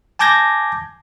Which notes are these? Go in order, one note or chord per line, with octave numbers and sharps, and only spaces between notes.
G#5 A5 D6 G6 G#6 A#6